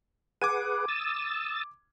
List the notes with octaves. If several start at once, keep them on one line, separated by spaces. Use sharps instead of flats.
G#4 B4 F#5 D6 G#6 D#7
D#6 E6 A6